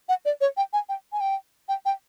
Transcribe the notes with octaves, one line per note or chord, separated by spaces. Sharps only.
F#5
D5
C#5
G5
G#5
G5
G#5
G5
G5
G5